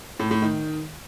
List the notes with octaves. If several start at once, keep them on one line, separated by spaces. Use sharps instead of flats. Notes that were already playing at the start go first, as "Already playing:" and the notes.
A2
A2
D#3